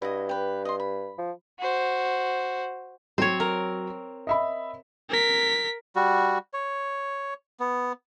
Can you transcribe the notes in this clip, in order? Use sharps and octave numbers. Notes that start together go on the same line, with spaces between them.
G2 E4 F#4 D#5
G4 B4
D#5 C6
B5
F3
F#4 C5
F#3 C4 C#5
A#4
D#5 E5 B5
A#4 B6
G3 F#4
C#5
B3